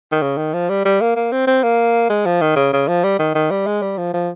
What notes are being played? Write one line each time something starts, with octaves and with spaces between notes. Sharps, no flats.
D#3
C#3
D#3
F3
G3
G3
A#3
A#3
C4
C4
A#3
G#3
F3
D#3
C#3
C#3
F3
G3
D#3
D#3
G3
G#3
G3
F3
F3